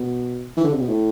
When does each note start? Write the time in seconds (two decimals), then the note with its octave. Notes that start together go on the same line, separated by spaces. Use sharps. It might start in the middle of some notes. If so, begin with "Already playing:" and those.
Already playing: B2
0.57 E3
0.64 D3
0.73 C3
0.81 B2
0.89 A2